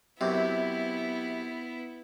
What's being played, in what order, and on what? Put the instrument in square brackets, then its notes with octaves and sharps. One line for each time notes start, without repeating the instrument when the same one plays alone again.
[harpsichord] F#2 C3 [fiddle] B3 E4